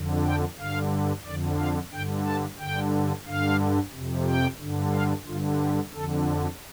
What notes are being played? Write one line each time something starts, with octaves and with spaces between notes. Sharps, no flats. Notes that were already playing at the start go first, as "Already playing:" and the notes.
Already playing: F2 D3
G5
G2 D3 F5
F2 D3 D5
F5
G2 D3 G5
A5
G2 D3 G5
G2 D3 F5
F2 C3
G5
G2 D3
F5
G2 D3 F4
G4
F2 D3 A4